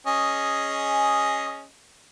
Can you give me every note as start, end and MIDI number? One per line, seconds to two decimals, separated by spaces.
0.07 1.66 61
0.07 1.66 68
0.07 1.66 75